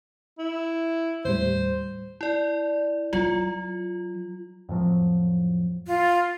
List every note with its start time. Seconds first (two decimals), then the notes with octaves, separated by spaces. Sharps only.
0.38 E4
1.25 D#2 A2 G3 C5
2.21 E4 D5
3.13 F#3 F4
4.69 F2 A2 F3 F#3
5.87 F4